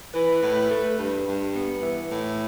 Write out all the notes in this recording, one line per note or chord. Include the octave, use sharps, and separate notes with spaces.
E3 B4
A2
A3
G2
G2
B3
E3
A2